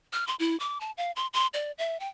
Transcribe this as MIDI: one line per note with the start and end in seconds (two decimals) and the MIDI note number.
0.13 0.26 89
0.27 0.35 84
0.39 0.58 64
0.60 0.78 86
0.81 0.91 81
0.97 1.12 77
1.16 1.27 84
1.33 1.47 84
1.54 1.72 74
1.78 1.99 76
2.00 2.08 79